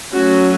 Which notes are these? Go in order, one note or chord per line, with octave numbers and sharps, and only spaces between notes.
F#3 A3 C#4 F#4